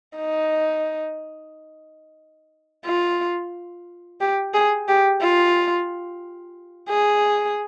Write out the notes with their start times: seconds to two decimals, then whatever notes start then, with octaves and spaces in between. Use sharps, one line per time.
0.17 D#4
2.86 F4
4.21 G4
4.54 G#4
4.88 G4
5.21 F4
6.90 G#4